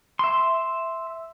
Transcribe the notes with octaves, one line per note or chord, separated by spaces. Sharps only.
E5 C6